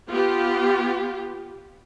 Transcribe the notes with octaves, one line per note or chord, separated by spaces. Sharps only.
B3 F4 G4